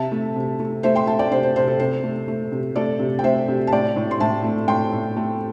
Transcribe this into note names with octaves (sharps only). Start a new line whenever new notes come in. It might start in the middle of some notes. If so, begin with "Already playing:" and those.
Already playing: C3 E5 A5
A3
C3
A3
A3 C5 E5
G5 C6
A3 E5 A5
D5 G5
C3 C5
C5
C3 C5
A4
C3 C5
A3
A3
C3
A3 A4 D5
C3
G5
A3 C5 E5
C3
A5
A2 D5 G5
A2
C6
A2 E5 A5
A3
A2 G5 C6
A2
A3